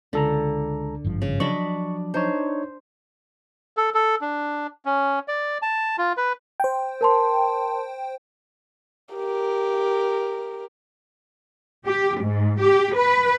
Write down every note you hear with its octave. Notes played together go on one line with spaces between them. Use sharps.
C#2 D3 A4 A#5
G#1 G2 F3
C#3
F3 F#3 D4 D#5 B5 C#6
D4 D#4 C5 C#5
A4
A4
D4
C#4
D5
A5
F4
B4
C5 G5
A#4 A5 C6
G4 A#4
G4
G#2
G4
B4